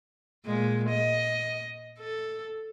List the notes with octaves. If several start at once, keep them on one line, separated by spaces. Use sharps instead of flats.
A#2 G#3
D#5
A4